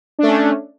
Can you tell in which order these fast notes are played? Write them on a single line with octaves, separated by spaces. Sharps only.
D4 A3 C#4